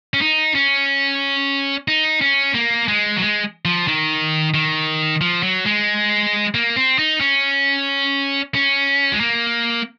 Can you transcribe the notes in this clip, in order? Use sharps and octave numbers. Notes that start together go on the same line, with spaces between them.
C#4
D#4
C#4
D#4
C#4
A#3
G#3
F#3
G#3
F3
D#3
D#3
F3
F#3
G#3
A#3
C4
D#4
C#4
C#4
G#3
A#3